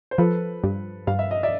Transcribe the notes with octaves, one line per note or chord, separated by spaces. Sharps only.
C5
F3 A4 B4
G2
G2 F5
E5
D#5
D5 E5